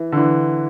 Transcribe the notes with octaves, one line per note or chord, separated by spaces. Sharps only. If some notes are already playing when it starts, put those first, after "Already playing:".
Already playing: E3
D3
E3